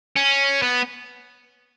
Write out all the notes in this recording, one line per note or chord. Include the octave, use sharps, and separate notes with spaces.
C#4
B3